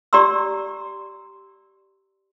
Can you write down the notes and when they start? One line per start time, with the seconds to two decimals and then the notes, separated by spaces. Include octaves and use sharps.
0.13 G4 D5 A#5 C6 E6